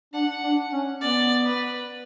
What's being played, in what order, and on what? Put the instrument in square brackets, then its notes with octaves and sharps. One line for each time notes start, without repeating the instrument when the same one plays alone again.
[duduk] D4 [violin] F#5
[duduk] D4
C#4
[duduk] B3 [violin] D5
[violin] B4